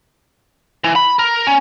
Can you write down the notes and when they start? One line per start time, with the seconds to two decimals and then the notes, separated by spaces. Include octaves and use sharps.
0.84 E3
0.96 B5
1.19 A#4
1.47 C#4